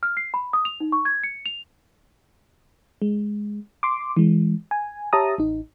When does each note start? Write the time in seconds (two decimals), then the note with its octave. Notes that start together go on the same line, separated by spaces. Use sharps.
0.03 F6
0.17 C7
0.34 B5
0.53 D#6
0.65 F7
0.80 D#4
0.92 C#6
1.05 G#6
1.24 C#7
1.46 F7
3.02 G#3
3.83 C6 D6
4.17 E3 G#3
4.71 G#5
5.13 G4 C#5 E5 A5 A#5 D#6
5.38 A1 D#4